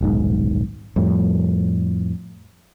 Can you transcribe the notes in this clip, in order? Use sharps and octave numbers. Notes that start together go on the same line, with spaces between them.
D#1 B1 G#2
F2 A2 G3